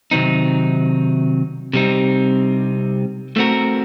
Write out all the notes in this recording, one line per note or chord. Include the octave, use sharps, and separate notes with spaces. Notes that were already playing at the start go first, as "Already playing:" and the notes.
C3 D#3 F#3 C4 D#4
C3 G3 C4 D#4
A3 C4 F#4 A#4